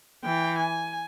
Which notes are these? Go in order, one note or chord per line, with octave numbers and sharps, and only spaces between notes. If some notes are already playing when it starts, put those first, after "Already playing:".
E3 G5
G#5